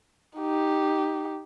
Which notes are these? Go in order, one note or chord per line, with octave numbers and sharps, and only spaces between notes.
D#4 G4